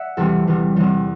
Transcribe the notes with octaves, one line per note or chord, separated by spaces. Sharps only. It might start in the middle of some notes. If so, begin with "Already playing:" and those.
Already playing: D5 E5 F#5
E2 C3 E3 G3 A4
E2 C3 E3 G3
E2 C3 E3 G3